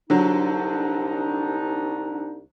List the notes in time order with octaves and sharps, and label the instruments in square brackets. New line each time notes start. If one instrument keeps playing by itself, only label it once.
[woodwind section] C2 D4 D#4 [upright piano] D3 F#3